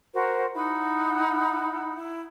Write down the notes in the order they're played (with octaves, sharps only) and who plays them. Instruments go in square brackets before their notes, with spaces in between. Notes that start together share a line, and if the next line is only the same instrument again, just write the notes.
[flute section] F#4 A#4 C5
D#4 E4 F#5 B5
E4